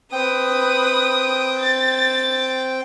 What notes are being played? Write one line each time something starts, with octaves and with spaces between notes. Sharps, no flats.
C4 B4 G5 D#6
A6